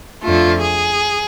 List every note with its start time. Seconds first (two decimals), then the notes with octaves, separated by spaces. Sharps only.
0.22 F2 D3 A3 F4
0.60 G#4